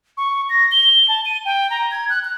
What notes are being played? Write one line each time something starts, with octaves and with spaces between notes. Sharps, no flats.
C#6
A#6
G7
A5
D#7
G5
A#5
G#6
F#6
F#6